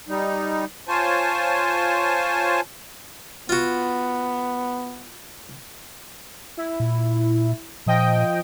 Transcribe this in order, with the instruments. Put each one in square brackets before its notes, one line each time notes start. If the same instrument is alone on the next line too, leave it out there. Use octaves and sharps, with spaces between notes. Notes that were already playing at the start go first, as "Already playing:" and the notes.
[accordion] G3 D#4
F4 C5 C#5 G#5 A5
[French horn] B3 [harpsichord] F4 F#4
[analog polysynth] E4
[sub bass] A#2
[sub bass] A#2 [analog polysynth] F3 D#5 G5